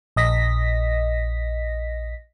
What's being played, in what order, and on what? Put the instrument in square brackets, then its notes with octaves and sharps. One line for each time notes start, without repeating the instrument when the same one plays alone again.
[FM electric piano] A#1 D#5 A#6 B6